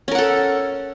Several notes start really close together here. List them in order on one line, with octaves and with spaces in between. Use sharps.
C#4 A#4 F#5 A4